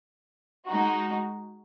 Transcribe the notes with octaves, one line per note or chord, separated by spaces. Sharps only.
G#3 D#4 F#4